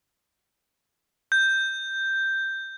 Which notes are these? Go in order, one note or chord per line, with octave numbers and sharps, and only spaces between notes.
G6